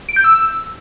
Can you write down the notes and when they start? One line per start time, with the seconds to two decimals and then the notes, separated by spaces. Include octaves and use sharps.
0.09 D7
0.16 G6
0.24 E6